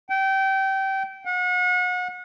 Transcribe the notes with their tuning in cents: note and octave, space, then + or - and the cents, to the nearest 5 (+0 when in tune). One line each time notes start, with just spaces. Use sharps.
G5 -25
F#5 -35